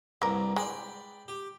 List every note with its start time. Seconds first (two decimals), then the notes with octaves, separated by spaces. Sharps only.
0.22 C2 G2 A#3 A#4
0.56 G#3 D5 G5 B5
1.28 G4